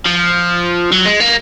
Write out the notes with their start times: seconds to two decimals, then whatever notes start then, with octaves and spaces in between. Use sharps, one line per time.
0.06 F3
0.92 F#3
1.05 G#3
1.20 A#3